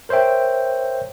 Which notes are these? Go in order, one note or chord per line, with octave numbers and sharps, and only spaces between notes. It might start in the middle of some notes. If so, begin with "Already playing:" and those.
A#4 C5 C#5 E5 G5